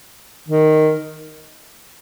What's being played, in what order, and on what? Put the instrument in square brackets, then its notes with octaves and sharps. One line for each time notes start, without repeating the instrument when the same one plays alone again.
[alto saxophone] D#3